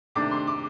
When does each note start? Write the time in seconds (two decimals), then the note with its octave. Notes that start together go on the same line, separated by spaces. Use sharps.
0.15 C3 D#3 A3 D4 D6
0.31 C6
0.47 D6